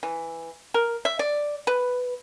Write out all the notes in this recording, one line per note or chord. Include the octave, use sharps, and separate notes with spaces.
E3
A#4
E5
D5
B4